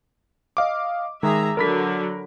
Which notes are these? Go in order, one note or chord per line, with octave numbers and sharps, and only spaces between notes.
D#5 F5 D6
D#3 G#3 G#4 E5 A#5
D3 F#3 A#4 B5 B6